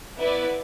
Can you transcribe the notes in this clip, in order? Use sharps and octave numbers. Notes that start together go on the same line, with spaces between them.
B3 E4 B4 D5